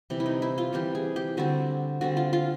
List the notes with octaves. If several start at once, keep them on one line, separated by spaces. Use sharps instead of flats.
C3 E3 G3
E4
D#4
E4
F4
C3 E3 G3 G4
G#4
G4
D3 G3 C4 F#4
D3 G3 C4 F#4
F4
F4